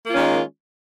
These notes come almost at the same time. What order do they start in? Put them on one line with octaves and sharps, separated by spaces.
A#3 F4 C#4 D#3 G#3